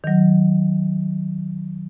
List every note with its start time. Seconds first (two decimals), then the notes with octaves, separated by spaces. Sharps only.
0.04 D#3 F#3